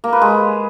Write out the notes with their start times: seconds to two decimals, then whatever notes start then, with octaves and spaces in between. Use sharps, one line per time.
0.04 A#3
0.13 B4
0.22 G#3